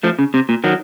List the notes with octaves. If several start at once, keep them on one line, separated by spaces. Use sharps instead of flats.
F3 A3
C#3
C3
A#2
D#3 F#3